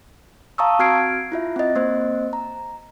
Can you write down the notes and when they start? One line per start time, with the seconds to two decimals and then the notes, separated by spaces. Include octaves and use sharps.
0.58 F5 A5 A#5 C#6 D#6 E6
0.79 C4 F#4 F6 G#6 C7 D7
1.32 E4 F4 E5
1.56 C4 D#5
1.75 A#3 C4 C5 D#5
2.33 A#5